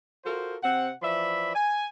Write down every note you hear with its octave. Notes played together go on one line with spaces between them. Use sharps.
F4 F#4 A4 A#4 C5
C3 C4 F#5
E3 F3 D5 E5 B5
G#5